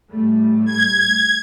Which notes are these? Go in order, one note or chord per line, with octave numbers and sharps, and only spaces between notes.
A2 G3 A3
G#6